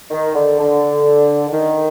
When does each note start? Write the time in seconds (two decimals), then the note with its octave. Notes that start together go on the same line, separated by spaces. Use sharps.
0.11 D#3
0.34 D3
0.58 D3
1.48 D3
1.52 D#3